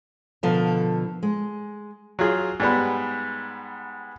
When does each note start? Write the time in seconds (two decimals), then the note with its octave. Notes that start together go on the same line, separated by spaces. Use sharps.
0.43 B2 D3 F3 A4 A#4
1.23 G#3
2.19 F#3 F4 G#4
2.60 G#2 G3 B3